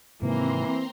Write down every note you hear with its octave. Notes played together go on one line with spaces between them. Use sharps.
G#2 C3 D#3 E3 A#3 C4 A#5 C6